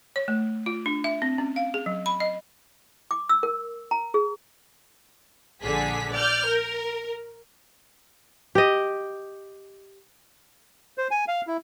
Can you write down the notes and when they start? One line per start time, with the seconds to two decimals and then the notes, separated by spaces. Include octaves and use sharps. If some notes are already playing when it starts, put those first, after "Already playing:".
0.16 C#5
0.28 A3
0.66 F4
0.86 D4
1.04 E5
1.22 C4
1.38 C#4
1.56 F5
1.74 G#4
1.86 F#3
2.06 B5
2.20 D#5
3.11 D6
3.29 E6
3.43 A#4
3.91 A#5
4.14 G#4
5.62 A#1 D3 G#4 B6
6.13 D5 F6 G6
6.47 A#4
8.55 G4 D#5
10.98 C5
11.11 G#5
11.28 F5
11.47 E4